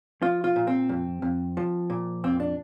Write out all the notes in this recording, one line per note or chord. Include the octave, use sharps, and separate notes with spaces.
F3 F4
F4
A#2
C4
F2
F2
F3
A#2
F2 C4
D4